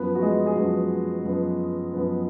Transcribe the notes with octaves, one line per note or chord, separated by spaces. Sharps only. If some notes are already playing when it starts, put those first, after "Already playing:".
Already playing: F#2 F3 B3 B4
F#4
G#3 G#4
G#4
F#2 F3 B3 F#4
F#2 F3 B3
F#2 F3 B3